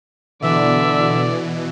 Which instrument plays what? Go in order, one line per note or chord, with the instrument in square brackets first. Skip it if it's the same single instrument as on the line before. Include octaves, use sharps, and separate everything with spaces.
[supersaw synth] B2 E3 [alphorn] D3 [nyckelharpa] D5 [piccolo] E5